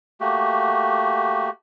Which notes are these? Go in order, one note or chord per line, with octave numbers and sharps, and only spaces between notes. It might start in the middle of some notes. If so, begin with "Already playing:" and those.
A3 A#3 F#4 G4